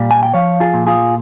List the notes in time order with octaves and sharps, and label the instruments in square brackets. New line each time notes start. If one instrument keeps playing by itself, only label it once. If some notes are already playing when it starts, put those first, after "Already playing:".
Already playing: [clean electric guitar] A#2 G3
G#5
G5
F3 C#5 F5
F4 G#4
A#2
F4 G#4